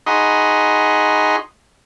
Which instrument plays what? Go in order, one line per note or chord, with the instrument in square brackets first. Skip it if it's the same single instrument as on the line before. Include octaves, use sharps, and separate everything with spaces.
[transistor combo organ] D#4 F#4 G#4 D#5 B5 C6